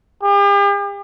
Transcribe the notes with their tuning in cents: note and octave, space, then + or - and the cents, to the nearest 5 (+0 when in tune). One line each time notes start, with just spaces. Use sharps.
G4 +45